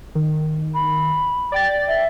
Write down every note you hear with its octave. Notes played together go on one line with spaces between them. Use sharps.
D#3
B5
D5 G5 A6
E5